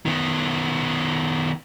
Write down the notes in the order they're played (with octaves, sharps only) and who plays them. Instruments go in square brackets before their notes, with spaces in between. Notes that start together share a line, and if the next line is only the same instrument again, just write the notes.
[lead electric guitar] D#3 B3